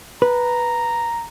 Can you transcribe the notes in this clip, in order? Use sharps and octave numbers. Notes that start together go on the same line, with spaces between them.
B4 A#5